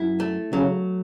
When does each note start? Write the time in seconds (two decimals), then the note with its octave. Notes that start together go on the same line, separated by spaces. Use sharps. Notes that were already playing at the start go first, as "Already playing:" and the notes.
Already playing: F#2 E4
0.20 A3
0.53 C#3 F#3